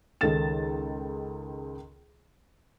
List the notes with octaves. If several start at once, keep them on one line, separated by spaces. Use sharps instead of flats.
C#2 D#3 D#4 A4 A6 E7